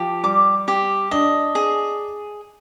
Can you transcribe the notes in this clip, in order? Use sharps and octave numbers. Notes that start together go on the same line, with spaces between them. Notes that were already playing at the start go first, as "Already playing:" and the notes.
Already playing: F3 G4
G3 D6
G4
D4 D#5
G#4